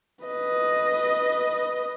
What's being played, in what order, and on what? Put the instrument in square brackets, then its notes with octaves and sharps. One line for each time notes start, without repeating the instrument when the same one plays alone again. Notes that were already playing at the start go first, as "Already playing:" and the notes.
[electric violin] B4 D#5